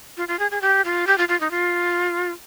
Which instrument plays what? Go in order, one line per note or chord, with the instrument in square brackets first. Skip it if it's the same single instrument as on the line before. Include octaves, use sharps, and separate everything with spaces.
[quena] F4
F4
G#4
G#4
G4
F4
G4
F4
F4
D#4
F4